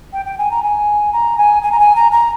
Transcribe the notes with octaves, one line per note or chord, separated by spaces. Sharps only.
G5
G5
G#5
A#5
G#5
A#5
G#5
G#5
A#5
G#5
A#5
A#5